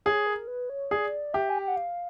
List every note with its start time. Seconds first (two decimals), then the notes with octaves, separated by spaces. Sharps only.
0.05 G#4 C#5
0.27 A#4
0.48 B4
0.69 C#5
0.91 G#4 D5
1.34 G4 E5
1.50 G#5
1.59 G5
1.68 F#5
1.77 F5